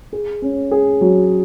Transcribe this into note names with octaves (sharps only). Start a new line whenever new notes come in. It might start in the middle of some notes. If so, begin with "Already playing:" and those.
G#4
C#4
G#4
F#3